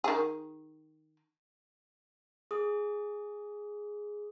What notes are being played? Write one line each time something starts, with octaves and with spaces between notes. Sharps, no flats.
D#3 G#4
G#4 D#6